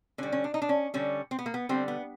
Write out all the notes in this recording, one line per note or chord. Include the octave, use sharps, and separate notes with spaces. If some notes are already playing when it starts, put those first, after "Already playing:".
D3 G3 C#4
C#4
D4
D#4
D4
C#4
D3 G3 C#4
C4
B3
A#3
B3
D3 G3 C4
B3